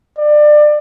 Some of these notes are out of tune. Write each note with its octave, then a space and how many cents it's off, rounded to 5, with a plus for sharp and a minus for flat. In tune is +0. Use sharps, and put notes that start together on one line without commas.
D5 +25